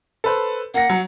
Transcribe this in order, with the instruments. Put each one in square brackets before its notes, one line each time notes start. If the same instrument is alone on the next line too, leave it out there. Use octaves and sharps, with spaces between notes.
[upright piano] A4 B4 C5
[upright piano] A#3 A#6 [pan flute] F#5
[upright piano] F#3